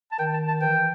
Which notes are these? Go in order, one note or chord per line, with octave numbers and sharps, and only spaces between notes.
A5
D#3 G5
A5
A5
E3 G5